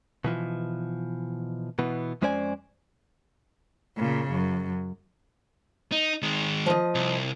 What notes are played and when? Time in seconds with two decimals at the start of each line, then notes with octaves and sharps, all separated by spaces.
0.24 B2 E3 F3
1.79 B2 E3 B3
2.22 F2 G#3 C#4 C5 D5 G#5
3.97 A#2 C#3
4.31 F#2
5.92 D#4
6.22 D#3 G#3
6.66 F3 D#5
6.95 C2